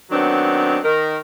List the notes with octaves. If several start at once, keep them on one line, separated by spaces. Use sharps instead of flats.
D#3 F#3 B3 C4 D4
D#3 A#4